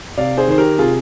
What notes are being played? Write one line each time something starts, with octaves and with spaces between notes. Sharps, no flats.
C3 D5 F5
G#4 C5
D#3 C5
G4 A#4
C3 F4 G#4